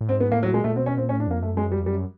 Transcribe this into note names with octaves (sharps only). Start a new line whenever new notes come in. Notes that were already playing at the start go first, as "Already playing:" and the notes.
A2
G#2 C4
B3
A2 A#3
F#3
A#2 G#3
A#2 A3
B2 C4
C#4
A#2 C4
C#4
A2
D4
F2 A#3
F#2 A3
G#3
G3
F2
F#2 G3